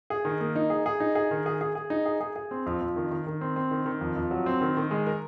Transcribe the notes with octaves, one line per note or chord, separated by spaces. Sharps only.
G#4
D#3
A#3
D#4
G#4
G#4
D#4
G#4
D#3
G#4
G#4
G#4
D#4
G#4
G#4
G#4
C4
F2
F2
D#3
D#3
D#3
C4
C4
D#3
D#3
F2
F2
F#3
C4
D#3
D#3
G#3
A#4